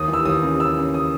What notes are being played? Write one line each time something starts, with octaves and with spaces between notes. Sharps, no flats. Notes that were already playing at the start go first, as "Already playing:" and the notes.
Already playing: D#2 D#6
E3
E6
D#2 D#6
C#3
D#2 E6
C#3
D#6